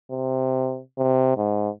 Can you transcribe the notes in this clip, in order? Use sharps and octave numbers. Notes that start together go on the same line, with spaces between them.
C3
C3
G#2